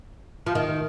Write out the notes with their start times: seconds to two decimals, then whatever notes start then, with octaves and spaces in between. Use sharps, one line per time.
0.46 F3
0.55 D#3